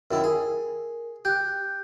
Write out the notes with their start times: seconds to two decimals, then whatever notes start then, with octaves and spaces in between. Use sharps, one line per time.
0.11 F#2 D#3 E4 A#4
0.24 G#4
1.25 G4 F#6 G6